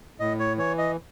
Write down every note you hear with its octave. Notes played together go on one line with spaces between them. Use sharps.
A2 D#5
C#5
E3 C#5
D#5